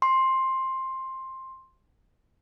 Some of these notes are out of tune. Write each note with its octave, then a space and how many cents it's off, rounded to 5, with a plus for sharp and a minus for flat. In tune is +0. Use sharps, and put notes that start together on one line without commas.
C6 +10